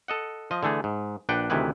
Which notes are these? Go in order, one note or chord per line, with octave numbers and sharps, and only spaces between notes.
A4 D#5 F#5
F3 D#5
D3 E3 A3 G#4
G#2
A#1 D4 B4 F#5 G5
D2 C3 D#3 E3 E4 B4